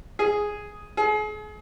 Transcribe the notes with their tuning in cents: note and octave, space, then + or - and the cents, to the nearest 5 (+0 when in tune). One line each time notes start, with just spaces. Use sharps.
G#4 +0
G#4 +35